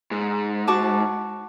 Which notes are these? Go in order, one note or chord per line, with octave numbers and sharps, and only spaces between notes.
G#2
F#4 A5 D6